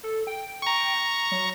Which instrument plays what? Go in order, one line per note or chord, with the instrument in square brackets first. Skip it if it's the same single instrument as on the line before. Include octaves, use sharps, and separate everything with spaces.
[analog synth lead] A4
G5
[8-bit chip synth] A#5 C#6
[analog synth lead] F#3